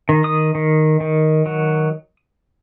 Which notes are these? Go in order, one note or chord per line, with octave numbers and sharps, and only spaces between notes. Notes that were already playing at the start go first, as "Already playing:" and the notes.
D#3
D#6
D#3
D#3
F#3